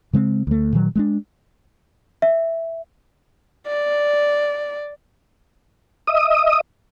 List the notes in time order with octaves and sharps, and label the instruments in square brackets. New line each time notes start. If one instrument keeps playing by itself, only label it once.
[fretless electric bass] C#3 G#3 A3 C4
D2 A3
A#2 D#3 F#3
G#3 A3 D4
[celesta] E5
[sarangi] D5
[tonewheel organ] D#5 E5 D#6